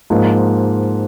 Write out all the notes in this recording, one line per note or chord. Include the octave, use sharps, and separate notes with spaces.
G#2 F3 A#3